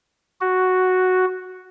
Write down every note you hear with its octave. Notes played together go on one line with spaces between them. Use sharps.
F#4